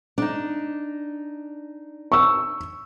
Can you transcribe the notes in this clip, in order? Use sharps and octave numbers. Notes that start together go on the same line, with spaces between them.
D4 D#4
C#6 E6